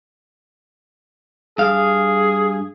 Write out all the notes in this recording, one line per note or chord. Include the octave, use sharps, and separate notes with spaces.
G2 G#4 F5